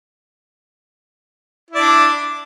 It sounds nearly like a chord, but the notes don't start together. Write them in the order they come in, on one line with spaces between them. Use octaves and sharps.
E4 D5 D4